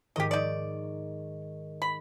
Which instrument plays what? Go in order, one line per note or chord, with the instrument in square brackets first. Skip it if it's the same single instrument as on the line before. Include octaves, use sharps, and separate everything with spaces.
[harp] G#2 D#3 C#6 [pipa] G4 D#5
[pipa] D#4 D5
B5